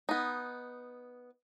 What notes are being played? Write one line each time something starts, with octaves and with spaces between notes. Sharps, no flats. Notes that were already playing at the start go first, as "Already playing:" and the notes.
B3 D#4